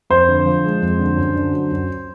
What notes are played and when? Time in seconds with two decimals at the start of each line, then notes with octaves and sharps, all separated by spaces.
0.10 F2 C5
0.28 D3
0.46 F3
0.64 G#3
0.82 F2
0.99 D3
1.17 F#2
1.36 D3
1.53 F#3
1.71 F#2